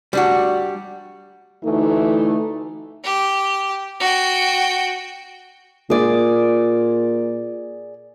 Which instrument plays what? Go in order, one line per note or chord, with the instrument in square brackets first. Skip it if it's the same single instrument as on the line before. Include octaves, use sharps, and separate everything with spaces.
[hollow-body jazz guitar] G3 D4 F#4
[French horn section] D2 E3 A3 D#4
[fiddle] G4
F#4 G5
[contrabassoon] A#2 [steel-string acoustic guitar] G#4 D5